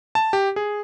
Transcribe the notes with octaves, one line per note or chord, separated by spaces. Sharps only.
A5
G4
G#4